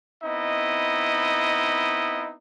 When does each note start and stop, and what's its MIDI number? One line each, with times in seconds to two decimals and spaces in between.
0.23 2.34 59
0.23 2.34 60
0.23 2.34 63
0.23 2.34 64
0.23 2.34 75